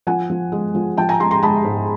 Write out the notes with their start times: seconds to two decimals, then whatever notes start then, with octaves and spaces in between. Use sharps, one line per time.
0.07 F3 F#5 G#5
0.30 F3
0.52 G#3
0.75 F3
0.97 F3 G5 A5
1.09 G#5 A#5
1.20 G#3 A#5 C6
1.31 A#5 C6
1.42 G#3 A5 B5
1.65 G#2